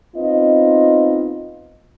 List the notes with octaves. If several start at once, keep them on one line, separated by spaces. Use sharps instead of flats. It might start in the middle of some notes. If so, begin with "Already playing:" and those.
B3 C4 D#4 F4 D#5